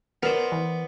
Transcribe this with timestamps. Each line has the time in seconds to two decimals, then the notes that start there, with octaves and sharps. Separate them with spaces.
0.23 B3 A#4 C5 D5
0.52 E3